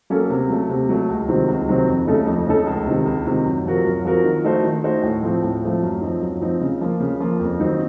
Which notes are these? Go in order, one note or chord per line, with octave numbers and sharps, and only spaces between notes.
F#3 A#3 C#4 A4
C3
F#3 A3
C3
F#3 A3
C#2
C3 D#3 F#3 C4
C#2
C3 D#3 F#3 C4
F2
C#3 A3 D#4 A4
F2
C#3 A3 D#4 A4
C#2
C3 D#3
C#2
C3 D#3
F#2
F3 C4 F#4 A#4
F#2
F3 C4 F#4 A#4
D#3
A3 D#4 F#4 C5
D#3
A3 D#4 F#4 C5
A2
F3 A3 C4
A2
F3 A3 C4
F#2
F3 C4 D#4
F#2
F3 C4 D#4
C#3
F3 A#3 F4
C#3
F3 A#3 F4
F2
D#3 F#3 C4 D#4